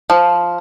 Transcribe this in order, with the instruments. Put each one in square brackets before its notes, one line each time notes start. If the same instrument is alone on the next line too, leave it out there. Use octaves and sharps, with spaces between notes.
[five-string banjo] F3